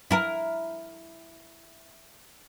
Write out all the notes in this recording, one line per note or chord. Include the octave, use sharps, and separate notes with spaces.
E4 A#4